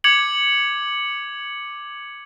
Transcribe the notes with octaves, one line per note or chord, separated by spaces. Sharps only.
D6 G#6 C#7 F#7